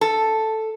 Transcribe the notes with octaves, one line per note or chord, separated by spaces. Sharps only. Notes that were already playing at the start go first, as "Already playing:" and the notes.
A4